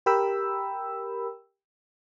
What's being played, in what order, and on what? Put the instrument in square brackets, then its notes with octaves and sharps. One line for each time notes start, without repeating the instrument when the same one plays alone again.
[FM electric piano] G4 A#4 G5 B5 E6